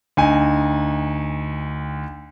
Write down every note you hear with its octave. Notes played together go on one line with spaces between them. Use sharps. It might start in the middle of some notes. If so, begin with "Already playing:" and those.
D2 D#4 G#5